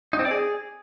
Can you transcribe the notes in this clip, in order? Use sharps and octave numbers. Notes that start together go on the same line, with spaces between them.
D#4
C4
D5
G#4